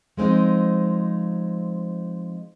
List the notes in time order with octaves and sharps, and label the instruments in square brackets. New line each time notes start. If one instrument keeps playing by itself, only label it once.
[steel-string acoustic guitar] F3 G#3 C4 D#4